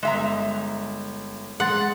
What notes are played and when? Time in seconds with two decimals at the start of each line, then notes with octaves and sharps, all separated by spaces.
0.03 G1 G#3 E5 A#5
1.60 G#3 F#5 C6 A6